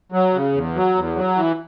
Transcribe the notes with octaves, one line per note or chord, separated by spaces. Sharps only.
F#3
C#3
E2
F#3
E2
F#3
E3